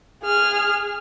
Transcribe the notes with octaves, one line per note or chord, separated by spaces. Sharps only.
G#4 F6